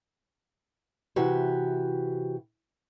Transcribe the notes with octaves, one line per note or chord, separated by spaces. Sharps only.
C3 E3 F#4 G4